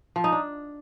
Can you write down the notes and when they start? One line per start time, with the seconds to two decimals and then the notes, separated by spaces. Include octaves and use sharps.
0.16 F3
0.24 D#4
0.32 D4